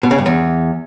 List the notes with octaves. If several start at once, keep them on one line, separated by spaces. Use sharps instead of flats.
B2
C#3
G2
E2